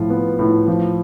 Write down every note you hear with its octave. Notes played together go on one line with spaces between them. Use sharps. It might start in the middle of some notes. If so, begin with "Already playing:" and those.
Already playing: A2 F3 F4
B3
A2
F3